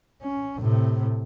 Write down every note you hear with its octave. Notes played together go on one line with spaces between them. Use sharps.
C#4
A2 C3